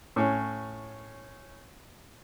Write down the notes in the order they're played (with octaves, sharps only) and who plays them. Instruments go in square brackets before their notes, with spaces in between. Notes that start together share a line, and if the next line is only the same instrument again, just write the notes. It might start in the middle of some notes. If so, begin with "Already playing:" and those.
[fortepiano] A2 C#4